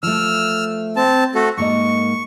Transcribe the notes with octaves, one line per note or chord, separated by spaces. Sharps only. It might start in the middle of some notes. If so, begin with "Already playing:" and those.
F3 A3 E6 F6
C4 A5
A3 F#4 A4
G#2 A#3 D#5 C#6